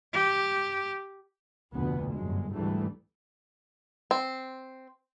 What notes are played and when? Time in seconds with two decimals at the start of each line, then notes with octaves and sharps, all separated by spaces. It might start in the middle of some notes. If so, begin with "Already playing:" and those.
0.13 G4
1.73 F1 D2 B2 B3
2.14 G1 F#2 G#3
2.53 D2 G#2 E3 G3 A3
4.11 C4